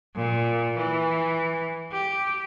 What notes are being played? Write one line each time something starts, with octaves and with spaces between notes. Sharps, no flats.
A#2
E3
G4